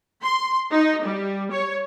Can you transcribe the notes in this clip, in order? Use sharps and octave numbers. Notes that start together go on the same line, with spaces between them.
C6
D#4
G3
C#5